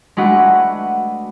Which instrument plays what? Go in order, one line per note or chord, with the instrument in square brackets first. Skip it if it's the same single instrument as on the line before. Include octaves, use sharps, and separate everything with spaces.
[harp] G#3 A3 D4 F#4 B4 F#5